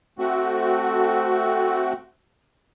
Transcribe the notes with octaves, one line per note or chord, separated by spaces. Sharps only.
A3 C4 F#4